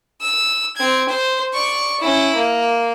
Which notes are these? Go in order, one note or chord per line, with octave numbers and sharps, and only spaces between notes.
E6
C4 G#6
C5
D5 C#6
C#4 E4
A#3